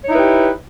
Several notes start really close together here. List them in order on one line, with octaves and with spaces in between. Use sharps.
C#5 D#4 E4 B4 G4